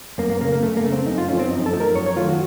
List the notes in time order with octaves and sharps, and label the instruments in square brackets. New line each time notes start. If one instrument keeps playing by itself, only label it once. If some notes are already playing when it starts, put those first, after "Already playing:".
[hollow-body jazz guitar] F#2 A#3
A#3
C#3 A3 A#3
A#3
F#2 A3
A#3
C#3 A3
C4
F#2 D#4
F4
F3 A3 C#4
C4
F#2 D#4
A4
F3 A3
A#4
F#2 C#5
C#5
D#3 F#3 A3 F4
F#4